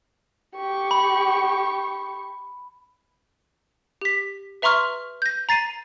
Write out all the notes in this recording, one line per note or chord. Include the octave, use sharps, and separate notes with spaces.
G4 C#6
B5
G4 B6
B4 E5 A#5 C6 C#6 F6
G6 A#6
A#5 A6 C7 D#7